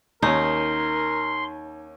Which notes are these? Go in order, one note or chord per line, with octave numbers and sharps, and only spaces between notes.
D#2 C#4 D#4 A#4 C6